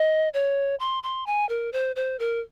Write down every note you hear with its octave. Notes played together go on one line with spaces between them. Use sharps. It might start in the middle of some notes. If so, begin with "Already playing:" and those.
Already playing: D#5
C#5
C6
C6
G#5
A#4
C5
C5
A#4